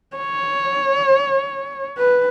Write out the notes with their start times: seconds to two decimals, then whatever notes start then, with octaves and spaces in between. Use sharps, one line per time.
0.17 C#5
1.98 B4